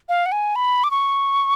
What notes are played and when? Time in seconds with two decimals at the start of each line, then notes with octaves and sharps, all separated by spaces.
0.09 F5
0.26 F#5
0.32 G#5
0.56 B5
0.84 D6
0.91 C#6